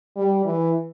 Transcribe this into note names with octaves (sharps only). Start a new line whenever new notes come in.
G3
E3